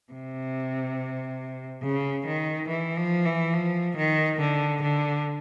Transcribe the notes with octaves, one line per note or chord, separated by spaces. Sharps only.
C3
C#3
D#3
E3
F3
E3
F3
D#3
D3
D3